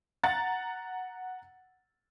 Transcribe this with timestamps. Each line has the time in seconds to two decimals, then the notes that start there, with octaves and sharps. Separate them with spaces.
0.24 F#5 A#5 A6